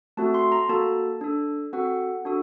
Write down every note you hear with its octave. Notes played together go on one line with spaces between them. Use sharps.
A3 C4 F#4 A4 A5
C6
A#5
A#3 F#4 A4 A5
D4 A4
C4 F#4 A4 F#5
D4 F#4 A4